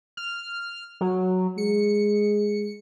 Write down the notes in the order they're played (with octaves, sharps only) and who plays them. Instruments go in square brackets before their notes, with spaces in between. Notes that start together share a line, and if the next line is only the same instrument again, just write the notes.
[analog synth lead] F6
F#3
[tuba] G#3 [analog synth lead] C#7